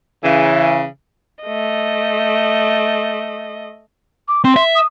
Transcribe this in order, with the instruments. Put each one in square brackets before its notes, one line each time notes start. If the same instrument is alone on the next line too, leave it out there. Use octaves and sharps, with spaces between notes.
[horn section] C#3 E3
[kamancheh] A3 D#5
[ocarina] D6
[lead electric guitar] C4 [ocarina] C6
[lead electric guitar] E5
[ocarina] D#6